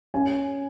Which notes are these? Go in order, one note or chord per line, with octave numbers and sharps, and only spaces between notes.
C#4 G#5